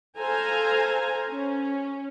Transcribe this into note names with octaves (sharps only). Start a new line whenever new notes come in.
A4 C5 F5 G#5 A#5
C#4